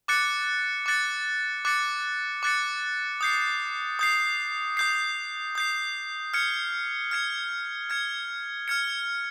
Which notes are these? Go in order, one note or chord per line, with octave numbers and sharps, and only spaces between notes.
D6 F#6 A6 C#7
D6 F#6 A6 C#7
D6 F#6 A6 C#7
D6 F#6 A6 C#7
D#6 G6 C7
D#6 G6 C7
D#6 G6 C7
D#6 G6 C7
F6 G#6 C#7
F6 G#6 C#7
F6 G#6 C#7
F6 G#6 C#7